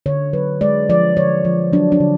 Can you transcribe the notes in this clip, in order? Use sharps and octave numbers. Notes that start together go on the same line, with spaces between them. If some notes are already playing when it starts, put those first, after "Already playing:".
D3 C#5
F#3 B4
G#3 D5
F3 D5
D3 C#5
F3
F#3 D4
D4
D3